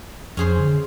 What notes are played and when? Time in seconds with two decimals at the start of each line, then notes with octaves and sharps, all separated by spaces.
0.37 F2 C#4 G#4 C5
0.60 D3